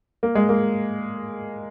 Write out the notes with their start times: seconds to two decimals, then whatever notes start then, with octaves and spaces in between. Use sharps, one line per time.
0.23 A#3
0.35 G#3
0.49 A#3